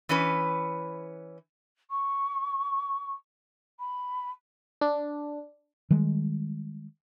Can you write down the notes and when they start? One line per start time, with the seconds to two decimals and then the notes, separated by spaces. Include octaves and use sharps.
0.09 E3 C#4 B4
1.90 C#6
3.79 B5
4.81 D4
5.91 D#3 G3 G#3